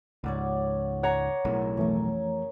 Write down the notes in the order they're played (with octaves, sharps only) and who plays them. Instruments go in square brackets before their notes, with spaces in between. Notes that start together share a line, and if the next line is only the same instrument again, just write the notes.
[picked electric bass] C#2 G#2 [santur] C#5 D5 F#5
[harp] C#5 A#5 [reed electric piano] F#5 [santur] G#5
[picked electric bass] B1 A2 [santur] G#4 A#4 E6
[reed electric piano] F2 E3 A3 [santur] C#4 A#4